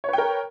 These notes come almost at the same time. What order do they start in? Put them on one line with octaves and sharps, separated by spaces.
C#5 B4 G5 A#4